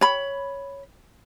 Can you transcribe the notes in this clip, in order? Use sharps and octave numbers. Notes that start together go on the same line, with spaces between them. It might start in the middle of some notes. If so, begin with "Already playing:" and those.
C#5 B5